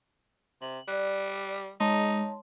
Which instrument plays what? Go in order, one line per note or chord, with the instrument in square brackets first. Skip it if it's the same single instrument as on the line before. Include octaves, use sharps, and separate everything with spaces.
[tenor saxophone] C3 [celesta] F#7
[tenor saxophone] G3 [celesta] D5 F#6
[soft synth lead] G#3 [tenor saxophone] D#4 [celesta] C#5 A5 C6